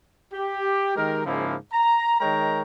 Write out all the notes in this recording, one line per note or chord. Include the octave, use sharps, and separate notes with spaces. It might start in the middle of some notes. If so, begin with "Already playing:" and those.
G4
D#3 G#3 G4 A#4
G#2 C#3 F3 G#3 A#3 E4
A#5
D#3 G#3 A#4 C#5 G5 A#5